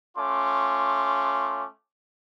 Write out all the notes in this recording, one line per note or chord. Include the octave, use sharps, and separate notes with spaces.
A3 C#4 F4 C6 D6